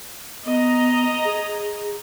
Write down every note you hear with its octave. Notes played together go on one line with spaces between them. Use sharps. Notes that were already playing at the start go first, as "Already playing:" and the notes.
B3 D#5 A#5
G#4